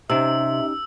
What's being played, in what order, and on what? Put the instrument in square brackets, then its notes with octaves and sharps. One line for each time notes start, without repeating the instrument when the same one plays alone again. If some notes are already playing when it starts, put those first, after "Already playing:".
[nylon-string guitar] C3 [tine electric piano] C#4 D#4 G4 [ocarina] E5 [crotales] E6